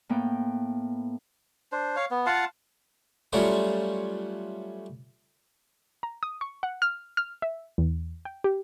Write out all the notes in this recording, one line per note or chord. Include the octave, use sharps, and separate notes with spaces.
A2 A#3 B3 G5
D4 C5
C#5 F5
B3
F4 F5 F#5 A5
F#3 G3 A3 C#4 F4 F#4
A#5
D#6
C#6
F#5
F6
F6
E5
E2
G5
G4